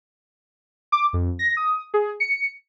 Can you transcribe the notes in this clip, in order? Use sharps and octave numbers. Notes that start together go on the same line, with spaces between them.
D6
F2
A#6
D#6
G#4
C#7